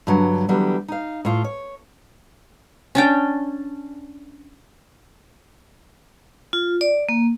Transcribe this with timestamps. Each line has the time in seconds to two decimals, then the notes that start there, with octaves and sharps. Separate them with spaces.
0.07 G2 D3 F#3
0.48 D3 E3 F#3 G3 B3
0.88 D#4 F5
1.25 A2 F4
1.44 C#5
2.95 C#4 D4 G5
6.53 F4
6.81 D5
7.09 A#3